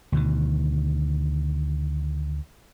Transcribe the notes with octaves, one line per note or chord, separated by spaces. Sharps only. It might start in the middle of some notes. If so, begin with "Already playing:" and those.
D2 B2 D#3